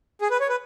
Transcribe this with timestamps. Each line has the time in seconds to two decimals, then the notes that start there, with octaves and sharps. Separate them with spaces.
0.21 G#4
0.31 B4
0.40 C#5
0.49 B4